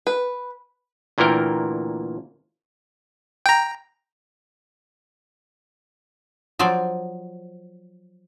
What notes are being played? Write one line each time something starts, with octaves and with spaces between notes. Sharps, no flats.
B4
D2 A#2 E3 A#3 A#4 G5
G5 A#5
F3 F#3 C5 D5